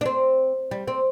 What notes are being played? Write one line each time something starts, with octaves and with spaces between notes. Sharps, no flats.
D4
C4
G3
C4